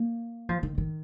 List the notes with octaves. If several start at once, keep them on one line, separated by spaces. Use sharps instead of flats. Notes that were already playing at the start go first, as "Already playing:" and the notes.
Already playing: A#3
F3
D#3
D#3